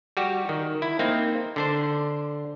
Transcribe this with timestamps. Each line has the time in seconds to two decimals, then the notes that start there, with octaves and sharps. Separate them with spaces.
0.17 G3 F#4 G4
0.49 D#3
0.82 E4
0.99 A#3 C4 D#4
1.56 D3 D4 C5